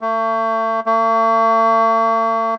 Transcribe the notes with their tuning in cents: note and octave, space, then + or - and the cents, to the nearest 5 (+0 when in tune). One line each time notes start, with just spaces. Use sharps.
A3 +35
A3 +45